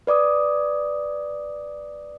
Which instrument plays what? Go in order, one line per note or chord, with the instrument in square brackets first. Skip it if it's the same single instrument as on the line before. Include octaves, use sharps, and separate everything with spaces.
[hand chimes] B4 D5 D6 D#6